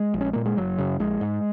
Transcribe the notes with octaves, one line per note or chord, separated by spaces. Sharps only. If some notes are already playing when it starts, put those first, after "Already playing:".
Already playing: G#3
A#1
C#4
A#2 A#3
G#3
F#1 F#3
F#2 C#3
A#1 G#3
G#2